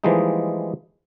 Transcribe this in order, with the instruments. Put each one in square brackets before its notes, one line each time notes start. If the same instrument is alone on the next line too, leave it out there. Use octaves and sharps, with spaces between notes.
[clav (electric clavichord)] E3 F3 G3 G#3 A#3 D#4